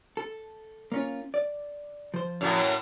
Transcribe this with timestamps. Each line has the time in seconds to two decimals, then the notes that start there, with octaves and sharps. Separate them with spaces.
0.17 A4
0.92 A#3 C#4 F4
1.34 D5
2.14 F3 C5
2.41 F#2 A2 A#3